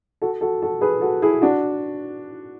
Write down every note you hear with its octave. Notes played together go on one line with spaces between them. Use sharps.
F#4 A4
F#4 A4
F#4 A4
G#4 B4
F#4 A4
E4 G#4
D4 F#4